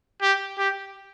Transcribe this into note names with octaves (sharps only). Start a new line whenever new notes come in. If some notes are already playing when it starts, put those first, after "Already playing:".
G4
G4